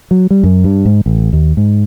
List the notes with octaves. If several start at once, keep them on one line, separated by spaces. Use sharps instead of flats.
F#3
G3
F#2
G2
G#2
A1
D#2
G#2